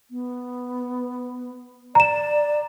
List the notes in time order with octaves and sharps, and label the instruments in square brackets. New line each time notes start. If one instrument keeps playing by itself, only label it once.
[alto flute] B3
[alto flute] D5 [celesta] A#5 E7